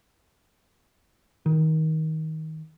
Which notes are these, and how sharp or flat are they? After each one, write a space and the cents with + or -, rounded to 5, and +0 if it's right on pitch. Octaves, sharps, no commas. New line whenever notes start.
D#3 +20